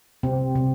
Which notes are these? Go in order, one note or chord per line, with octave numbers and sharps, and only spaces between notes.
C3 C4
C3